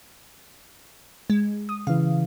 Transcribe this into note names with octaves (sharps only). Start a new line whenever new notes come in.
G#3
D#6
C#3 E3 F5